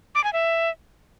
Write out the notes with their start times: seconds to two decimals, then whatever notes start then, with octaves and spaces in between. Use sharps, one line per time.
0.15 D6
0.24 G#5
0.33 E5